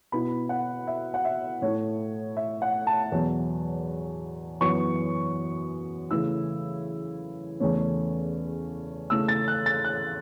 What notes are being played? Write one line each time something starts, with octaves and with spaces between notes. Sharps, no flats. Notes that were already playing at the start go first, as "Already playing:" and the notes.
B2 B3 E4 B5
F#5
E5
F#5
E5
A2 A3 E4 C#5
E5
F#5
A5
E2 B2 F#3
F#2 E3 B3 C#6
C#3 E3 A3 E4 E6
E2 C#3 A3 C#4
C#3 A3 E4 E6
A6
F#6
A6
F#6